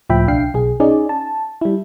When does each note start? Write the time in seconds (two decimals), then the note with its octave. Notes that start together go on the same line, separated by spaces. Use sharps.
0.09 C#2 A2 F3 E5 G5 B5
0.28 B1 D4 F5 G5 C7
0.54 B1 G#4
0.80 C#4 D#4 G#4 D5
1.09 A5
1.61 G3 E4